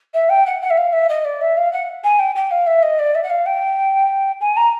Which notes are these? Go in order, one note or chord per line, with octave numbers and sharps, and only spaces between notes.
E5
G5
F#5
F#5
E5
F5
E5
D#5
D5
E5
F5
F#5
G#5
G5
G5
F5
E5
D#5
D5
E5
F#5
F5
G5
G#5
A#5